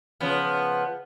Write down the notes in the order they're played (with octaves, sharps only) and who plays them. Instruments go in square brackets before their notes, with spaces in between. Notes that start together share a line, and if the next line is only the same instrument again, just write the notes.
[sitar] C#3 F3 B3